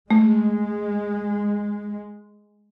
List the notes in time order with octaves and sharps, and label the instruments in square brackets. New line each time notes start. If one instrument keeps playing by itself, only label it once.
[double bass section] G#3 [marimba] A3